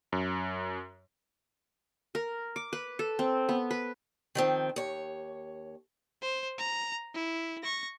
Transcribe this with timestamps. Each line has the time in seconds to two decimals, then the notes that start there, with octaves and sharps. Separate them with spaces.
0.12 F#2
2.15 A#4
2.56 D6
2.73 B4
2.99 A4
3.19 C4
3.49 B3
3.71 B4
4.35 D#3 F3 C4
4.76 D#2 C#5
6.22 C5
6.58 A#5
7.14 E4
7.63 C#6 A#6